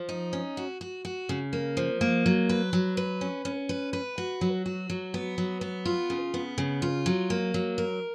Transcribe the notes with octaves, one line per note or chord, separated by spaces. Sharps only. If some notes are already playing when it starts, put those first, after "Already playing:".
Already playing: F3
D#4
C#4
F#4
F#4
F#4
C#3
A#3
F3
A#3
F#3
B4
F#3
B4
C#4
C#4
B4
B4
F#4
F#3
F#4
F#3
B3
F#3
B3
F4
C#3
B3
C#3
F4
F#3
A#3
F#3
A#4